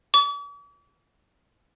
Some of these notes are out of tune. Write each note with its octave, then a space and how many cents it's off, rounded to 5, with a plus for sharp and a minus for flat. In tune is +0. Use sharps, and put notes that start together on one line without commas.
D6 -45